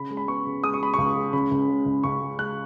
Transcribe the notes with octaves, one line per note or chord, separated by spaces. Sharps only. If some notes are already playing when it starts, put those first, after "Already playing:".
Already playing: C#3 B5
G#3
B5
B3 C#6
C#3
G#3 D#6
C#6
G#3 B5
C#2 C#6
G#3
C#3 B5
C#2
G#3
C#2
C#2 C#6
G#3
G#3 F#6